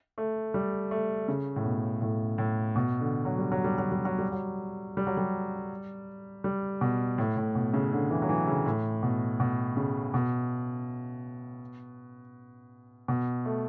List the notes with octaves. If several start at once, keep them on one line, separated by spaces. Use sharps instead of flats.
A3
G3
A3
C#3
A2
B2
A2
A2
B2
D3
F#3
G3
F#3
G3
F#3
G3
F#3
G3
F#3
G3
F#3
G3
G3
B2
A2
A2
B2
C#3
D3
E3
F#3
E3
C#3
A2
B2
B2
C#3
B2
B2
A3